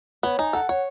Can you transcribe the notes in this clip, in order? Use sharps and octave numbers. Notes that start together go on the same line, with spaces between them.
B3 C#5
D#4 G#5
A4 F#5
C#5 F#5